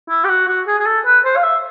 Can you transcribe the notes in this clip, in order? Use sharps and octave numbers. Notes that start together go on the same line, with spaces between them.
E4
G4
F#4
F#4
G#4
G#4
A4
B4
C5
F5
E5